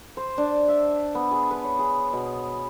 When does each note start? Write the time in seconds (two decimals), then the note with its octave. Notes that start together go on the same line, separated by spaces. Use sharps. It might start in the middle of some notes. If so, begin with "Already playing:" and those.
0.17 C5
0.38 D4
0.68 E5
1.15 B3
1.31 G#4
1.50 B4
1.64 C#5
1.79 G#4
2.13 B2